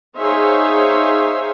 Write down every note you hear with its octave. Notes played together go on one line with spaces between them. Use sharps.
D#4 G#4 C5 C#5 E5 F5